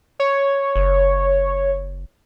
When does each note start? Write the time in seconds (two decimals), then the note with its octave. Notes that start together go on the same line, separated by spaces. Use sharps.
0.20 C#5
0.76 F#1